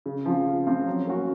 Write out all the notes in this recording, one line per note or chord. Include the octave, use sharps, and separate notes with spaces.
C#3
F3 C4 F4
C#3
F3 C4 F4
F#3
A#3 C#4 F#4